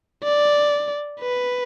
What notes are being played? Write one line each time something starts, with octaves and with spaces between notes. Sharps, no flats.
D5
B4